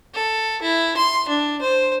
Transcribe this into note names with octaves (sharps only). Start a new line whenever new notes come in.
A4
E4
C6
D4
C5